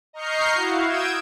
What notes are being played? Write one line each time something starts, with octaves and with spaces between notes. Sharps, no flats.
D#5 A#5 C#6 F6 G6 C7
E4 F#4 F5
D#6 E6 G6 G#6 D7 E7